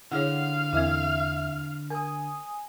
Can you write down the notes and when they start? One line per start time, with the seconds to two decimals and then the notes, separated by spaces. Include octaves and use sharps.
0.12 D3 E4 G#4 C#5 F5 F#5
0.73 E2 C4 E4 E5
1.90 A#4 G#5 D#6